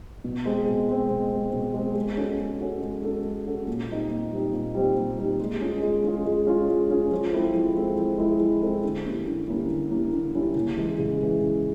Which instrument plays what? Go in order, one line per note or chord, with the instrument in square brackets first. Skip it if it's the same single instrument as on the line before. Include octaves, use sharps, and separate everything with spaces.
[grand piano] B2
G#3 C4
B2
G#3 C4
B2
G#3 C4
B2
G#3 C4
G#3
C#4 F#4 A4
G#3
C#4 F#4 A4
G#3
C#4 F#4 A4
G#3
C#4 F#4 A4
A#2
G3 C4 D#4
A#2
G3 C4 D#4
A#2
G3 C4 D#4
A#2
G3 C4 D#4
G#3
C#4 F4 G#4
G#3
C#4 F4 G#4
G#3
C#4 F4 G#4
G#3
C#4 F4 G#4
F3
G#3 C4 E4 A4
F3
G#3 C4 E4 A4
F3
G#3 C4 E4 A4
F3
G#3 C4 E4 A4
D3
G3 A#3 C#4 E4
D3
G3 A#3 C#4 E4
D3
G3 A#3 C#4 E4
D3
G3 A#3 C#4 E4
C#3
E3 G#3
C#3
E3 G#3
C#3